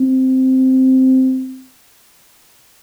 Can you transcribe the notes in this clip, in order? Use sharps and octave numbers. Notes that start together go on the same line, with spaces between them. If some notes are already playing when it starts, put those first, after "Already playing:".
Already playing: C4